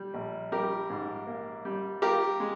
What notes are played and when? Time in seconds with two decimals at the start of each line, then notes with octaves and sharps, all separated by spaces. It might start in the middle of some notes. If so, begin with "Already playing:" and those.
Already playing: G3
0.14 A#1
0.52 G3 G4 A#4
0.90 G#2
1.27 A#3
1.65 G3
2.02 F4 G4 A#4
2.40 G#3